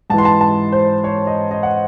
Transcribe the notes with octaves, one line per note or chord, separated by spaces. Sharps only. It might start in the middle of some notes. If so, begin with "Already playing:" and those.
G#2 E3 A5 C6
A5
A5
C5
C#5
D#5
D#5
F#5